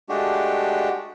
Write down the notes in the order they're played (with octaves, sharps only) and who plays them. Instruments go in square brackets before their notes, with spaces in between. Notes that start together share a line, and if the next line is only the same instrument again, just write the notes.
[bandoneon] G#3 A3 D4 F#4 G4